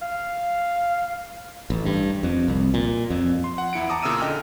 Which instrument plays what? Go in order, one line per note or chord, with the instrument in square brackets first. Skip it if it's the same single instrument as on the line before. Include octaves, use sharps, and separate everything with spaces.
[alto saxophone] F5
[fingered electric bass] A1
G2
F2
C2
A#2
F2
[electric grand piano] C6
F#5
E2 E4 C#7 D7
A5 A#5 D6 D#6
A#2 C#3 C#4 D#6 E6 D#7
D3 D#5 G5 F6